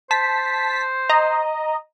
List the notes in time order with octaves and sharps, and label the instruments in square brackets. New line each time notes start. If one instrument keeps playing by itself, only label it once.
[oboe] C5 [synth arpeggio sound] A5 B6
[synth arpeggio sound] D#5 A#5